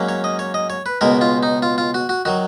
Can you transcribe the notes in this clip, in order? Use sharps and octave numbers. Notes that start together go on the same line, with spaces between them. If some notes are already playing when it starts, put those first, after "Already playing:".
Already playing: G#2 F#3 A#3 C#4
C#5
D#5
C#5
D#5
C#5
B4
C#2 B2 G#3 A#4
F4
D#4
F4
F4
F#4
F#4
D#3 F#3 F#4